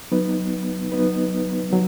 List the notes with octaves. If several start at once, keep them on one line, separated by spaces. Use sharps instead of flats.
F#3 B3 D#4 B4
F#3 B3 D#4 B4
F#3